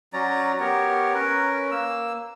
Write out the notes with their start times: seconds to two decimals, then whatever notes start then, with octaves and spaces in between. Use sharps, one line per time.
0.13 F#3 C#4 D5 A#5
0.60 B3 G4 A#4 C#5
1.15 C#4 A#4 B4
1.71 A#3 E6